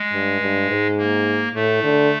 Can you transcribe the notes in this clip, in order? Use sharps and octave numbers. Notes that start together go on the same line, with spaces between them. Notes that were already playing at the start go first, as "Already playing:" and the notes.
Already playing: G#3
G2
G2
G#2
A#3
A2 A3
D3